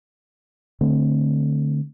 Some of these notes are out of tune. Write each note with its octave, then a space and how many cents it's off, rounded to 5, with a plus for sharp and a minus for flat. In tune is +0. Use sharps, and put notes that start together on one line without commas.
D3 +0 A3 +0 C4 +0